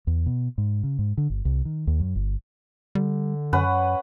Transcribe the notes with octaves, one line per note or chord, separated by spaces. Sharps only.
E2
B2
G#2
C#3
G#2
D3
G1
C2
D#3
D#2
F#2
G1
D3 G3
F#2 C#4 B4 F#5